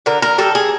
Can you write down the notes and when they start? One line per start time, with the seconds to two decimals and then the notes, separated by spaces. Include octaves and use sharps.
0.06 D3 A#4
0.22 A#4
0.38 G3 A4
0.55 G#4